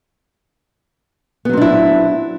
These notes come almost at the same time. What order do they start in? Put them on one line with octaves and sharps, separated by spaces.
B3 F#3 C4 D4 E4